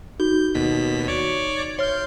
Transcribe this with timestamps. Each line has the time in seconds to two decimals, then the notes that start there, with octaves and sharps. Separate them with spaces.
0.20 D#4 F#4 G6
0.54 D#2 B2 B6
1.08 C#5 D5 D6
1.79 C#5 C6 F6 G6 G7